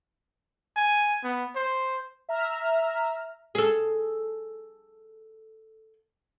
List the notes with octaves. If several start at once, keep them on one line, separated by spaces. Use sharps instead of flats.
G#5
B3
C5
E5 A#5 F6
G#4 A4